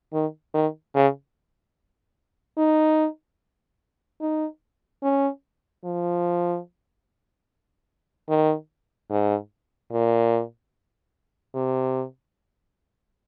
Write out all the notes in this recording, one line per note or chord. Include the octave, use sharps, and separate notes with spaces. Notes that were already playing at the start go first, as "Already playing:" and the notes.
D#3
D#3
C#3
D#4
D#4
C#4
F3
D#3
G#2
A#2
C3